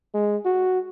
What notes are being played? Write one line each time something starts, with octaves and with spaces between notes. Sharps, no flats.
G#3
F#4